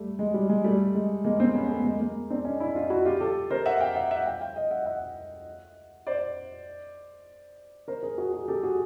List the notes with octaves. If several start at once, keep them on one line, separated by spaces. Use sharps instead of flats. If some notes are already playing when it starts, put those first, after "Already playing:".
Already playing: G3 A3
G#3
G3
G#3
G3 A3
G#3
G#3 A#3
A#3 C4
B3 C#4
A3 B3
G#3 A#3
G#3 A#3
C4 D4
C#4 D#4
D4 E4
D#4 F4
E4 F#4
F4 G4
G4 A4
A#4 C5
E5 F#5
F5 G5
E5 F#5
E5 F#5
F5 G5
F5 G5
D#5 F5
E5 F#5
E5 F#5
C5 D5
A#4 C5
G#4 A#4
F#4 G#4
F#4 G#4
G4 A4
F#4 G#4